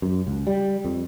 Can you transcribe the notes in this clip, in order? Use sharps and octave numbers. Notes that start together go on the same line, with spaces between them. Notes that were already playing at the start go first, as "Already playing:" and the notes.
F#2
C#2
G3
F2